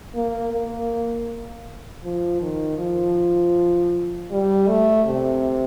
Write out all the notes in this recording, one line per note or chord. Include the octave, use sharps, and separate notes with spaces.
A#3
A#3
F3
D#3
F3
G3
A3
C3